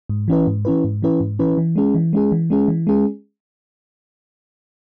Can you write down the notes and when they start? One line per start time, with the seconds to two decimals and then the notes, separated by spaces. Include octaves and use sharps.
0.09 G#2
0.28 E3 C#4 E4 B4
0.47 G#2
0.65 E3 C#4 E4 B4
0.84 G#2
1.02 E3 C#4 E4 B4
1.20 G#2
1.39 E3 C#4 E4 B4
1.58 E3
1.76 G#3 C#4 G#4
1.95 E3
2.13 G#3 C#4 G#4
2.32 E3
2.50 G#3 C#4 G#4
2.68 E3
2.87 G#3 C#4 G#4